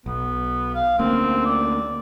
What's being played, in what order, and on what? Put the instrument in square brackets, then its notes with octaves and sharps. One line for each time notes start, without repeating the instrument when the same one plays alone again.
[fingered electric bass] B1 [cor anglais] B3
[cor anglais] F5
[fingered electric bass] D2 A#3 C#4 [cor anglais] C4
[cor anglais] D5